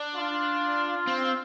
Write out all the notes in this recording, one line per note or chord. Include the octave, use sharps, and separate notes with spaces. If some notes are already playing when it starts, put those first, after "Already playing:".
Already playing: D4
F4
C4